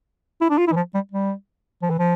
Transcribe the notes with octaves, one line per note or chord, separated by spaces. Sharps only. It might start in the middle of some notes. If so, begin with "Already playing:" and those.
E4
D4
F4
E4
E3
F3
G3
G3
F3
E3
F3